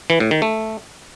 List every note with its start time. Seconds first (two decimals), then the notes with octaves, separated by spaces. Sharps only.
0.10 E3
0.20 A2
0.31 D#3
0.42 A3